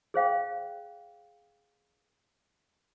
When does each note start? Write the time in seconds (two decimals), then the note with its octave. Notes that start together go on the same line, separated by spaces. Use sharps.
0.14 G#4 C5 F5 G5